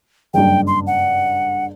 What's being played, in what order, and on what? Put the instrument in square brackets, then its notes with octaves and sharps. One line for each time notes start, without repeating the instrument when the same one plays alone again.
[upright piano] F#1 G2 [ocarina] G5
[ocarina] C6
F#5